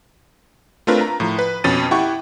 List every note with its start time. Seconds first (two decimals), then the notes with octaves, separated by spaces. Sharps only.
0.87 A3 C4 D4 F4 A#4 B4
1.01 A#5
1.20 A2 F3
1.39 B4
1.64 F2 B2 C#4 B5 A6 D#7
1.91 E4 G4 F#5 G5 C#6